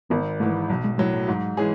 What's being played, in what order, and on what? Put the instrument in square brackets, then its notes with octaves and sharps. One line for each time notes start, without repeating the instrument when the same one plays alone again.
[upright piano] G#1 [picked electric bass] B3
[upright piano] G#2 E3 [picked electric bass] A3
[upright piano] B1 [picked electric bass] F#3
[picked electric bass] G#3
[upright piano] A2 F#3 [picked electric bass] G#3
[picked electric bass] F#3
[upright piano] G#2
E3 G#3 C#4 G#4